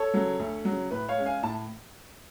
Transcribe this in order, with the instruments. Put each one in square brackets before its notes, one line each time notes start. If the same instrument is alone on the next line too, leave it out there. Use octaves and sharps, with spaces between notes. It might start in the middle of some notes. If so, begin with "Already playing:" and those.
Already playing: [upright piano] A4 C#5
C#3 F#3
D2
C#3 F#3
A2 B4
C#5 F5
G#3 C#4
F5 G#5
A2 A5